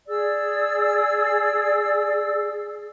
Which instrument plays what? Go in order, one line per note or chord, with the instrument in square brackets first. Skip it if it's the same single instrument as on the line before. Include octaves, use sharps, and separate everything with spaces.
[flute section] G#4 D5 E6